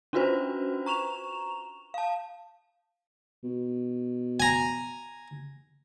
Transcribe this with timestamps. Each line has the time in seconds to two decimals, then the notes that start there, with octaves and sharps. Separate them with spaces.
0.13 C#4 D4 F4 F#4 B4 C5
0.86 A#5 C#6 E7 F7
1.94 F5 A5
3.44 B2
4.40 G#5 A#5